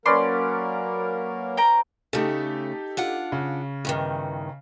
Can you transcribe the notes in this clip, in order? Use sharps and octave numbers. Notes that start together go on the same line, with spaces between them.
F#3 A#3 C#4 A#4 B4 D5 C6
G5 A#5
C#3 A3 D#4 G4 A4
D4 F4 F#5
C#3
E2 G2 D#3